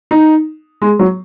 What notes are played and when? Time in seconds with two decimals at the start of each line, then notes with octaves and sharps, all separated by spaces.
0.11 D#4
0.82 G#3
0.99 F#3